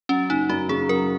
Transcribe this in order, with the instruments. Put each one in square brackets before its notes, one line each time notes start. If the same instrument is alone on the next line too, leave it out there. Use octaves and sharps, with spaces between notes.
[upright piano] F#3 [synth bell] C#4
[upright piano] F#1 [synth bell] D#4
[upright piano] F#2 [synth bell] F#4
[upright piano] C#3 [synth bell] G#4
[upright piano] F#3 [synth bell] A#4